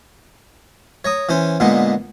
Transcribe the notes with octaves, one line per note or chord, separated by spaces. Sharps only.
C#5 A#5 D#6
E3 C#4 C5
A#2 D3 G#3 B3 D#4